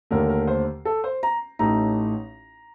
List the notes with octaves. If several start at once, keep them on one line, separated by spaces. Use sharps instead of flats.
D#2 D3 A3 A#4
A#4
C5
A4
C5
A#5
A1 A2 A3 D#4 A#5